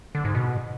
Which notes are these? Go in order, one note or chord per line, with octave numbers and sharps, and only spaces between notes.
D3
G#2
B2